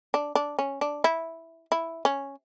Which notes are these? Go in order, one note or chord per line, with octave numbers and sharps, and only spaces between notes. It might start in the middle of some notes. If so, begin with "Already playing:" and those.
D4
D4
C#4
D4
E4
E4
C#4